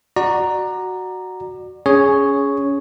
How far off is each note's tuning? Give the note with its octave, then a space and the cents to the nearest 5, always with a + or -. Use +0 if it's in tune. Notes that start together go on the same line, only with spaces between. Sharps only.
F#4 +0 D5 +25 A#5 +0
C#4 +20 G#4 +0 C#5 +0